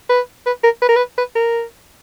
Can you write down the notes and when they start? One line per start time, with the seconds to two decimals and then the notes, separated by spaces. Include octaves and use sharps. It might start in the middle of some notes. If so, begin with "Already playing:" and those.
0.10 B4
0.46 B4
0.64 A#4
0.82 B4
0.88 A#4
0.96 B4
1.18 B4
1.35 A#4